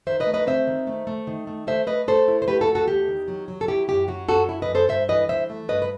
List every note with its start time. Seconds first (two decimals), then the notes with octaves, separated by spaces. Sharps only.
0.07 D#3 C5 E5
0.20 B4 D#5
0.27 A3
0.34 B4 D#5
0.47 C4 C5 E5
0.67 D#3
0.87 A3
1.07 A3
1.27 D#3
1.47 A3
1.67 A3 C5 E5
1.87 A3 B4 D#5
2.07 A3 A4 C5
2.28 E4
2.42 C5
2.47 A3 G4 B4
2.61 F#4 A4
2.68 A3
2.75 F#4 A4
2.88 E2 G4
3.08 D#3
3.28 F#3
3.48 F#3
3.61 A4
3.68 E4 G4
3.88 F#2 G4
4.08 F#3 F#4
4.29 F#2 F#4 A4
4.49 E4
4.62 B4 D#5
4.68 F#2
4.75 A4 C5
4.88 G2 C5 E5
5.09 E3 B4 D#5
5.29 E3 C5 E5
5.50 A3
5.68 G2 B4 D#5
5.82 B4